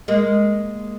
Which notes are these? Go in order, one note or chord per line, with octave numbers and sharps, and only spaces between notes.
G#3 A#3